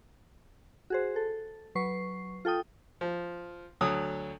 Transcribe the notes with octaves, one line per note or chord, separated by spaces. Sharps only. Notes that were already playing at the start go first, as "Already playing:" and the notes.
F#4 G#4 C5
A4
F#3 B4 C#6 C7
F4 A4 G5 D#6
F3
D2 F#3 A4 D#6